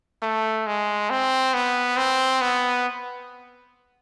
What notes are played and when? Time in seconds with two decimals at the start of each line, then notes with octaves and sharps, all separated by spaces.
0.22 A3
0.66 G#3
1.10 C4
1.54 B3
1.97 C4
2.41 B3